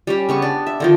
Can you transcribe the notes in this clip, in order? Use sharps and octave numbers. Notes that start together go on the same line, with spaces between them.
G3 C#4 G4
C#3 B3 C#6
D4
E5
D3 D#3 F3